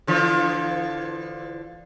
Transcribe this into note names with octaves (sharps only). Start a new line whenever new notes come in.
D3 E3 F3